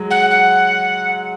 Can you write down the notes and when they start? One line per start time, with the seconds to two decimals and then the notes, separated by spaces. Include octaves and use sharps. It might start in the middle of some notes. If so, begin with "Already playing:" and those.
Already playing: F#3 G#3
0.10 F#5
0.30 F#5